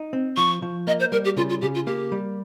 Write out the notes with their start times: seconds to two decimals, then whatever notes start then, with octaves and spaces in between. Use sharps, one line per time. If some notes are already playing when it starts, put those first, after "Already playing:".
Already playing: D#4
0.13 C4
0.37 F3 C#6
0.62 F3
0.87 A#3 D#5
1.00 C5
1.12 G3 A#4
1.25 G4
1.36 C#3 F4
1.49 F4
1.61 C#3 G4
1.75 F4
1.87 A#3 G4
2.12 G3